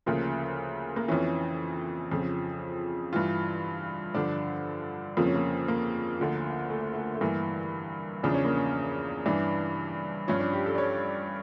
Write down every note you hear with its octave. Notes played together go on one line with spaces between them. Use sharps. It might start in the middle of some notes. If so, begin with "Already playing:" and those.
D2 C#3 F3 A#3
A#3
F2 E3 C#4
F2 C#3 F3
G2 E3 F4
G2 D3 F3 D4
F2 C#3 F3 A#3
C#4
A#3
A#3
D2 D3 F3
A3
A3
A3
G2 E3 A#3
E2 C#3 F3 D4
C#4
A#3
C#4
G2 E3 D4
G2 F3 C#4
D4
G4
A4
D5
C#5